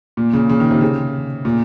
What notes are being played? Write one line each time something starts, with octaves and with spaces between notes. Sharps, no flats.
A#2
C#3
C#3
D#3
C3
C#3
A#2